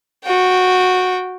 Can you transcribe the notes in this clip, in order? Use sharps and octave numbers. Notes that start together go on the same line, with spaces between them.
F#4 G5